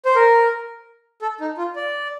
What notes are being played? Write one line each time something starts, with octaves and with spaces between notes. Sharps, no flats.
C5
A#4
A4
D#4
F4
D5